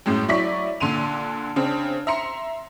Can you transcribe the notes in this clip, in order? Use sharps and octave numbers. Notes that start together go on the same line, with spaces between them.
F#2 A2 G#3 C#4
F#3 E4 D5 C#6 B6
A#2 D3 C6 D#7 F7
C#3 C4 D4
E5 A#5 C6 C#7